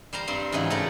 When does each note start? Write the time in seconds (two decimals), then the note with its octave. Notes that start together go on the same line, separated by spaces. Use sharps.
0.13 G3 C5 F5 A#5
0.27 G2 G3 C4 C6
0.52 G#2 C#3 E3 F#3 E4
0.70 C#3 A3 G4 A4 D5 A#5